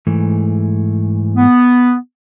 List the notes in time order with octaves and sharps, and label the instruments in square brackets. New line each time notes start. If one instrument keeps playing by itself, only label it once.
[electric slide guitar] G#2 E3 A3
[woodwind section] B3